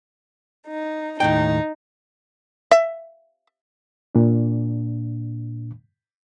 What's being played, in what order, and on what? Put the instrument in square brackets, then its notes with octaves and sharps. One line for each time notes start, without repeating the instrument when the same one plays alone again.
[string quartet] D#4
[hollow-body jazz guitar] D#2 A2 G5 [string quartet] D#4
[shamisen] E5
[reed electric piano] A#2 D4